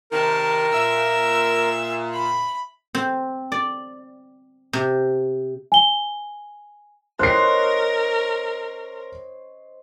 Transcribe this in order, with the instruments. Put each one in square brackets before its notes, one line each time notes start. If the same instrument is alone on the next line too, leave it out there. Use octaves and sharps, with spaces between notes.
[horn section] C3 D#3 [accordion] A#4 [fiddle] A5
[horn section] A#2 [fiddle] E5 E6
[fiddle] B5
[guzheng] C4
D5
C3
[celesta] G#5 G7
[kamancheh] A#4 [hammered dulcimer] C5 C#5 D#5 [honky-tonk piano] F#6 C7